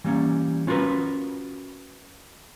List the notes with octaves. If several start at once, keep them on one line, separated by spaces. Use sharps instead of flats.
E3 G3 A#3 C#4
C#4 F4 F#4 A#4 B4